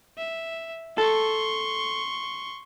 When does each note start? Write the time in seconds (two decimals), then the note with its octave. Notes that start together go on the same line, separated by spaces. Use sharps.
0.18 E5
0.98 A4 C6 C#6